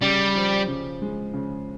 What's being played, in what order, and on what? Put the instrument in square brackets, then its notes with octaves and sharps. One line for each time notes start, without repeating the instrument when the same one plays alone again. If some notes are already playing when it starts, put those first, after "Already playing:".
[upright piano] C#3 [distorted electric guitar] G3
[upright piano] F3
C#3
G#3
C#3